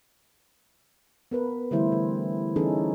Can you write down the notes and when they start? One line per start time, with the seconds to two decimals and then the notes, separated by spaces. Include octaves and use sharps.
1.31 B3 A#4 B4
1.71 D3 E3 G3 A3 E4 C5
1.92 D3
2.56 E3 C#4 D#4 G#4 A4